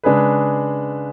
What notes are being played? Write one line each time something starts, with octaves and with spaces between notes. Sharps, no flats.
C#3 G#3 D4 G#4 B4